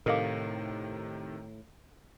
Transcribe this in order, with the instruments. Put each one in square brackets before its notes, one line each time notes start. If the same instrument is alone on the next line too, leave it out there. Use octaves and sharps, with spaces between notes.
[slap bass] A2 [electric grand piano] C3 D#3 [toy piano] A4 F5 [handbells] A#4 D#5 D6